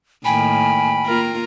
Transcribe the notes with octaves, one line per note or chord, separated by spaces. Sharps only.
A2 D#3 A#3 G5 G#5 B5
A#3 F4 A#4